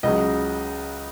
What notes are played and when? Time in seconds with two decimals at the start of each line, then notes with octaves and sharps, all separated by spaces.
0.03 C#2 C#3 F#3 D#5